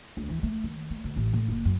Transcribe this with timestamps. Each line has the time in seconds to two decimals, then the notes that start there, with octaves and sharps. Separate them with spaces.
0.17 D2
0.29 E3
0.43 A3
0.64 D#3
0.90 A3
1.04 D2
1.16 A1
1.33 A2
1.48 F#1
1.65 F#2